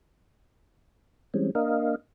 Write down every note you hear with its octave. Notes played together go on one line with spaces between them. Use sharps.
E3 G3 G#3 C4 C#4
A#3 D4 A#4 D#5 F5